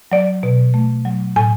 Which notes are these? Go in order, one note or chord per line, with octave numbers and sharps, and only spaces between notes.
F#3 D5
B2
A3
F#3
A2 G#5